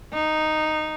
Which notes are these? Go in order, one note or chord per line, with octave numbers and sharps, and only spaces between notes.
D#4